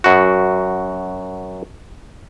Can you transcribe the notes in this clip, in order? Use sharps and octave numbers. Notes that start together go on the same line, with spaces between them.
F#2 F#4